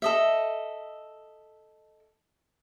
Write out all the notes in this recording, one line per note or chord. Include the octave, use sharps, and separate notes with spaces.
A4 D#5 E5